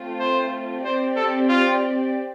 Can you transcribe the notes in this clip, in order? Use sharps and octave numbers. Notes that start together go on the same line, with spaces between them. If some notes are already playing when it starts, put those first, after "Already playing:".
Already playing: A3 C4 F4
C5
C4 G4 C5 D5
A4
F4